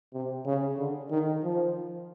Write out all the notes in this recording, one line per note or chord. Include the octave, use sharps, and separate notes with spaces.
C3
C#3
D3
D#3
F3